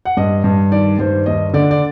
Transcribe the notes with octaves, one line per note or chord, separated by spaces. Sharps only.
F#5
G2 D#5
G2
D#3 D5
G2 C5
D#2 D#5
D3 D5
D5